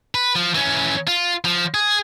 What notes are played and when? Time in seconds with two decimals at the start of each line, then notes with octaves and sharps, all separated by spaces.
0.15 B4
0.36 F3
0.55 E3 C#4
1.08 F4
1.45 F3
1.74 G#4